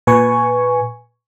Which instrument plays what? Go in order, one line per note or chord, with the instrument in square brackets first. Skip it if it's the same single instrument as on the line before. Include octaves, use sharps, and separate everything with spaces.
[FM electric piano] A#2 B4 G#5 C#6